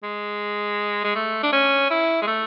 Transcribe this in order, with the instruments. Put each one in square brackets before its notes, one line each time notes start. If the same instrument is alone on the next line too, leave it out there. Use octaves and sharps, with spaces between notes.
[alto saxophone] G#3
G#3
A3
D4
C#4
E4
G#3
A3